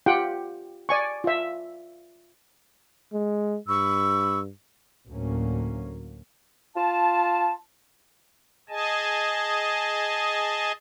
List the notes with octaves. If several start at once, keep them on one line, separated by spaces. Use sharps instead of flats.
F4 G4 F#5 G5
D5 G#5 C#6
F4 E5
G#3
G2 B5 C#6 E6
D2 A2 F#3 A#3 C#4
F4 A5
G#4 D#5 G#5 A5